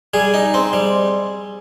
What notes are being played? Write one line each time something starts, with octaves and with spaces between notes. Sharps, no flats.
G3 G#4
D#4
C4
G3